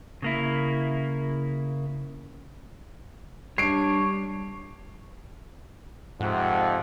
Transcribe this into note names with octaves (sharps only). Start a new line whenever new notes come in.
C#3 A#3 E4
G3 D4 C#5 C7 D7
F2 G#2 C3 F#5